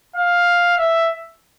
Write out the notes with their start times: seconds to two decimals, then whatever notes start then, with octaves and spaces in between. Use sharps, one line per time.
0.16 F5
0.78 E5